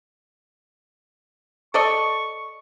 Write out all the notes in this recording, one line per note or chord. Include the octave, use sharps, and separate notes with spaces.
A4 D5 D#5 C#6